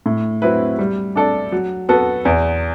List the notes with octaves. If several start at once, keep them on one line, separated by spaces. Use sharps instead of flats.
A2
F#3 C4 E4 B4
G3
D4 A4 D5
F#3
B3 F#4 A4
E2